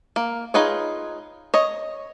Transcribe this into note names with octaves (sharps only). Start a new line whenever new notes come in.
A#3
D#4 F4 G#4 B4 C#5
C#5 D#5